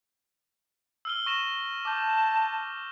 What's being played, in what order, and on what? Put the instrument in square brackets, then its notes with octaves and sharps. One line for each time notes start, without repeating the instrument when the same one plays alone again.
[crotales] E6 F6 G7
C#6 A#6 E7
[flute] A5 [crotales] D6 G6